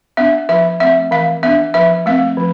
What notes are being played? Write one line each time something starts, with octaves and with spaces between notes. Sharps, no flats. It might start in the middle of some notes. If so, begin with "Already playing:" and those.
B3 D4 E5
F3 E5
A3 C4 E5
E3 F5
B3 D4 E5
F3 E5
A3 C4 F5
F3